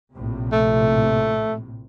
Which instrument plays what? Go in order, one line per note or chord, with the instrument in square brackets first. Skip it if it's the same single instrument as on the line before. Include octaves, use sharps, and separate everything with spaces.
[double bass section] A#1 A2 C3
[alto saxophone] A3